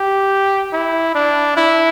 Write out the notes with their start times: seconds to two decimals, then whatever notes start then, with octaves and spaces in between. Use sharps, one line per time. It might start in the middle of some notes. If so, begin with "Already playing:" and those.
Already playing: G4
0.73 E4
1.15 D4
1.57 E4